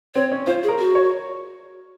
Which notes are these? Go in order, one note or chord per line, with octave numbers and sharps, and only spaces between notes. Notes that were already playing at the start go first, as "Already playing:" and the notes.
C4 C#5
C#4
F4 C5
G#4
A#4
F#4
C#5